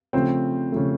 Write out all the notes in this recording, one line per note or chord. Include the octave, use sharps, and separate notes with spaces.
C#3 F3 A3 C4 C5
C#3 F3 A3